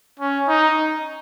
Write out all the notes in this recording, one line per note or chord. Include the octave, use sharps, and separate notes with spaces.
C#4
D#4